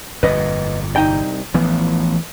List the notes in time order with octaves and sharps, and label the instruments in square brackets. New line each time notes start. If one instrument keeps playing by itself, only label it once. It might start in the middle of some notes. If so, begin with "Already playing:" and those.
[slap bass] G1 F2 A#2 [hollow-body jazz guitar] B4 D#5
[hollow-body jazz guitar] C2 D#4 G5
[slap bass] A1 F3 B3 [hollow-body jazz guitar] E3